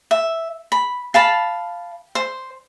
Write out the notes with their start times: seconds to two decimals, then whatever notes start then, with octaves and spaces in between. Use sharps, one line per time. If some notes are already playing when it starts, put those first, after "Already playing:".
0.11 E5
0.72 B5
1.14 F5 A5 B5
2.15 C5